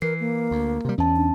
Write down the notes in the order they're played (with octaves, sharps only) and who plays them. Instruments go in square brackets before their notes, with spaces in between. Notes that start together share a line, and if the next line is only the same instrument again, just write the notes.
[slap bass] E3 [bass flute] A#4 [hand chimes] C7
[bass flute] A#3
[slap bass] D2
C3 G3
[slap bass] E2 [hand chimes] C#4 A5
[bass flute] D4